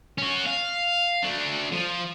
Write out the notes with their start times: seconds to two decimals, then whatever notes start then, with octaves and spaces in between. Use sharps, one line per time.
0.18 C#4 F#4
0.47 F5
1.24 A3 D4
1.72 F3